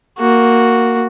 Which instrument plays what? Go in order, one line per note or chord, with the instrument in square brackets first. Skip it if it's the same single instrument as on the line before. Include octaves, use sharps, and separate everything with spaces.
[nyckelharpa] A#3 F#4